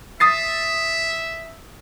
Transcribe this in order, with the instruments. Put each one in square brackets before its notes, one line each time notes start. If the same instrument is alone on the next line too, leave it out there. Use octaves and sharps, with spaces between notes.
[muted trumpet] E5 [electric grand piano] D#6 A6 C7